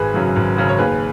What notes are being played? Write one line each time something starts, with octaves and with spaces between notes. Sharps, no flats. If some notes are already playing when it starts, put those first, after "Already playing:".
Already playing: G#1 G#4 B4
F#2 C#3 F#3
G#1
F#2 C#3 F#3
C#5
D#2 G#4 B4